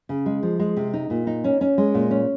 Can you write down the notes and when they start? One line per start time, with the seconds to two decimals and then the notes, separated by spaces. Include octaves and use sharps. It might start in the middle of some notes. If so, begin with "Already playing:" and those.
0.09 C#3
0.26 G#3
0.43 F3
0.60 G#3
0.77 C3
0.93 D#4
1.10 A#2
1.27 D#4
1.44 C#4
1.61 C#4
1.78 G#3
1.94 A#2
2.11 C#4